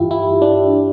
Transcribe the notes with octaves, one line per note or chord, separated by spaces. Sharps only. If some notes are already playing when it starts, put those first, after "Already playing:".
Already playing: G2 E3 E4 F4 G4 E5
E4
D4